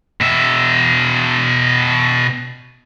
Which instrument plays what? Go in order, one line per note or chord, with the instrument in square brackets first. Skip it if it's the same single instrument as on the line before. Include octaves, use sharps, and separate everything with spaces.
[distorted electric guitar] B2 E5